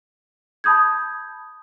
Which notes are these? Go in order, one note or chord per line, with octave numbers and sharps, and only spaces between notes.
A5 B5 D#6 G6 G#6